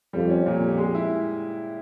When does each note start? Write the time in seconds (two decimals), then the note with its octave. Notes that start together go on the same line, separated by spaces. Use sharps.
0.13 F2 G3
0.30 C#4
0.45 F2 A#2
0.62 G4
0.78 G#3
0.95 E4